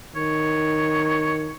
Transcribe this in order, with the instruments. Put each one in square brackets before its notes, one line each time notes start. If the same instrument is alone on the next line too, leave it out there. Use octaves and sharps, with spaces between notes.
[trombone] D#3 [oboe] C#5